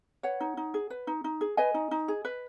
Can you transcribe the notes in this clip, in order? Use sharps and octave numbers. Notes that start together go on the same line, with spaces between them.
B4 C#5 F#5
D#4
D#4
G#4
B4
D#4
D#4
G#4
B4 D#5 G#5
D#4
D#4
G#4
B4